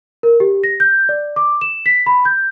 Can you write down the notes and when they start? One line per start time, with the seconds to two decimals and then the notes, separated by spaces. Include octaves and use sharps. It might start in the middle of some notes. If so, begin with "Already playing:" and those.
0.23 A#4
0.40 G4
0.64 A#6
0.80 G6
1.09 D5
1.36 D6
1.61 E7
1.86 B6
2.06 B5
2.25 G6